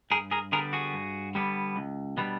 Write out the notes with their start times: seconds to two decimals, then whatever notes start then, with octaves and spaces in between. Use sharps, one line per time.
0.11 G2 G#4 A#4
0.31 G#4 A#4
0.52 D3 G3 B3 D4 G#4 A#4
0.73 F#4 G#4
0.93 G2
1.35 D3 G3 B3 D4
1.76 C#2
2.17 B2 G3 B3 D4